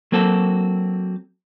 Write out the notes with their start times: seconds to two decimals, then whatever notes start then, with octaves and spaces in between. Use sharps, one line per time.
0.12 F#3 A#3 C4 F#4 A4